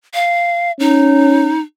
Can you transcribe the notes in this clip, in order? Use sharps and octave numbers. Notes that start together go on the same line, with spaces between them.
F5
C#4 D#4